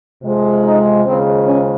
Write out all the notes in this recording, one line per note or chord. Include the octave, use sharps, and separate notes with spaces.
F2 C3 F3 G#3
D#4
D#2 C#3 F3 G#3 C4
C#4